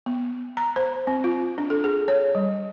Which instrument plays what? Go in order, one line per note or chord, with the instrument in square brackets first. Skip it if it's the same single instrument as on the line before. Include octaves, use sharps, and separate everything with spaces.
[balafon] B3
A#5
C5
C4
F4
D4
A4
G#4
C#5
G3